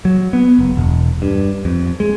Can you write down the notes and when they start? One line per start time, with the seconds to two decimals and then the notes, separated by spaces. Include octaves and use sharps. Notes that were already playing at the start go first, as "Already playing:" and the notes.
0.05 F#3
0.33 B3
0.59 F#1
0.77 E1
1.22 G2
1.65 F2
2.00 G#3